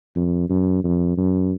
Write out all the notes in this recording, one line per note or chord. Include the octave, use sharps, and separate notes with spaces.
F2
F#2
F2
F#2